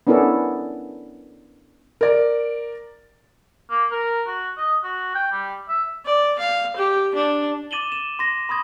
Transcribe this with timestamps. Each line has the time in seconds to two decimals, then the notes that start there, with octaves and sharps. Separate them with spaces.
0.07 B3 C#4 D4 E4 A4 A#4
2.01 A#4 D5
3.70 A#3
3.91 A#4
4.27 F#4
4.58 D#5
4.84 F#4
5.15 G5
5.32 G3
5.68 E5
6.06 D5
6.39 F5
6.76 G4
7.15 D4
7.71 D6 A6 D#7 E7 F#7 G7
7.92 E7
8.19 C6 A#6
8.49 B5 C6 D#6 G#6